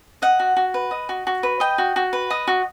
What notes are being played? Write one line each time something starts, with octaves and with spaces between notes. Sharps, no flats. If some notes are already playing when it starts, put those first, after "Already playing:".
D#5 F#5
F#4
F#4
B4
D#5
F#4
F#4
B4
D#5 G5
F#4
F#4
B4
D#5
F#4